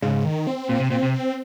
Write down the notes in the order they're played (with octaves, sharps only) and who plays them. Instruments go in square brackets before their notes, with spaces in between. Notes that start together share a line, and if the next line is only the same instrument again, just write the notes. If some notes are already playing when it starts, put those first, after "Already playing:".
[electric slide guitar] G#2 [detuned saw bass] C#3
[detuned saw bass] D#3
C4
[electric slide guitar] A#2 [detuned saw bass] C4
[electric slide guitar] C3
[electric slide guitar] A#2 [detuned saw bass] C4
[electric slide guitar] C3
[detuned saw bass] C4